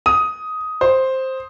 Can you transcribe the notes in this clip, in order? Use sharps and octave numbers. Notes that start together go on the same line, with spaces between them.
D#6
C5